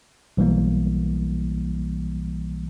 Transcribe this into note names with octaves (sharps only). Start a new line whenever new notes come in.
B1 E3 G3 A#3